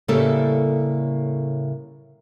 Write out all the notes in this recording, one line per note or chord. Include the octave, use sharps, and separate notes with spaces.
A2 C#3 G3 A3 A#3 A4